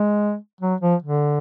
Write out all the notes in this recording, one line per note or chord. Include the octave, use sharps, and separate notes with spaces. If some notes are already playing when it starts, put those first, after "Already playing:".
Already playing: G#3
F#3
F3
D3